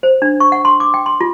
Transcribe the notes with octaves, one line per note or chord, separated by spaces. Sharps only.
C5
D4
C#6
F#5
C6
D6
G5
C6
F4